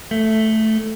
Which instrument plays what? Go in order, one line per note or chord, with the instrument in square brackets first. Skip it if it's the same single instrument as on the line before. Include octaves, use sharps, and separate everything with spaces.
[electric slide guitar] A3